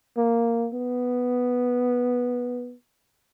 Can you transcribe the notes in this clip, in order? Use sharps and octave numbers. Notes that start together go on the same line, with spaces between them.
A#3
B3